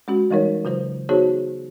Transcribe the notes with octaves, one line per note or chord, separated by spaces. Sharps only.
G#3 C#4 F#4
E3 G3 G#3 D#4 A#4 C#5
C#3 F#3 F4 C5
B3 D#4 F#4 G#4 C5 C#5